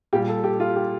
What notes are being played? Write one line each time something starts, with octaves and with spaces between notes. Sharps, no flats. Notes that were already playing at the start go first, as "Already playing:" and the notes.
A#2 G3 G4
A4
G4
F4
G4